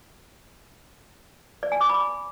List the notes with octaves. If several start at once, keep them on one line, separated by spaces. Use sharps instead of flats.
D5
G#5
D6
B5